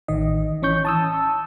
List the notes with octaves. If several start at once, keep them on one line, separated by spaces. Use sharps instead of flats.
A1 D#3 D#5
E3 C#4 C#6 G6
A5 D#6 E6